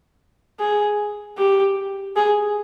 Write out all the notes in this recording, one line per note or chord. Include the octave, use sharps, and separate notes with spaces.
G#4
G4
G#4